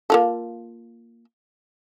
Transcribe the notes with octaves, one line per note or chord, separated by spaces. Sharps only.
A#3 F4 A4